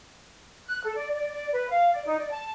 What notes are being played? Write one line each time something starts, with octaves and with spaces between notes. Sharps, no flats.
F#6
A4
D5
D5
D5
B4
F5
D5
D#4
D5
A5